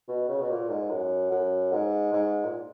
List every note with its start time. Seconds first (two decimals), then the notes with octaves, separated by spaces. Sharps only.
0.08 B2
0.29 C#3
0.41 B2
0.50 A#2
0.70 G#2
0.91 F#2
1.31 F#2
1.73 G#2
2.13 G#2
2.45 A#2